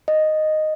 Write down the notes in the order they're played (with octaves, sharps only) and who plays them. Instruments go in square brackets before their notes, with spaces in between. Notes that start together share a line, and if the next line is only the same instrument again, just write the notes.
[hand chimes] D#5